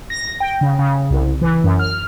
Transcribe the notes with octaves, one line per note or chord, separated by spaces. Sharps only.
A#6
G5
C#3
C#3
C2
E3
F#2
F6